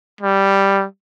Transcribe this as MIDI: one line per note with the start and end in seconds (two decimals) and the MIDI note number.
0.21 0.84 55